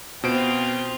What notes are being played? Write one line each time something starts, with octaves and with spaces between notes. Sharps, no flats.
B2 C4 F4 C5 D7